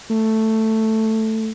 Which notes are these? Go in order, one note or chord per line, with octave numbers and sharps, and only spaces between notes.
A3